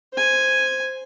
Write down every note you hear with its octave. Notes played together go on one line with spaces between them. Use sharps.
C5 G#5